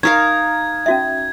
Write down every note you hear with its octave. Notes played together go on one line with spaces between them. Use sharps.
D#4 A#4 F5 C#6 G#6
C#4 F#4 E5